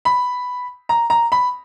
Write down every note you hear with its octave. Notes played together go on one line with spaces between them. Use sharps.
B5
A#5
A#5
B5